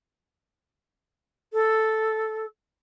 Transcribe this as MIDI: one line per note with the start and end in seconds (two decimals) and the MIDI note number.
1.53 2.46 69